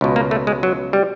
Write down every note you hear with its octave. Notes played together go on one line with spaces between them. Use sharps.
C#2 B2
A#3
A3
G#3
F#3
G3